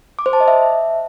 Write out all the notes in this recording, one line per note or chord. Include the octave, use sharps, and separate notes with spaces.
D6
C5
A5
D#5
E5